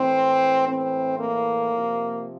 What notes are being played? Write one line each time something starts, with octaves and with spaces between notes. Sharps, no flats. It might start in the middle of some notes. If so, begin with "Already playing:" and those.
Already playing: A2 E3 C4
C4
A#3
C3 F3